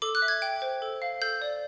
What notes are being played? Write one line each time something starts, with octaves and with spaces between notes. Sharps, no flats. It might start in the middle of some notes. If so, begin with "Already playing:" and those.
A4 D6
F#6
E5
G#6
G5
C5
A4
F5
A4 G6
D5